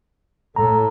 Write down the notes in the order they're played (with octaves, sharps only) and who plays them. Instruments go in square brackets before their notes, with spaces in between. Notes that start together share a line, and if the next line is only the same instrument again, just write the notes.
[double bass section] A2 [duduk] A4 [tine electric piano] A#5